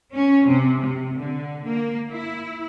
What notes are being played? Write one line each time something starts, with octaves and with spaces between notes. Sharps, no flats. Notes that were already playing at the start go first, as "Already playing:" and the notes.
C#4
C3
C3
D3
A#3
E4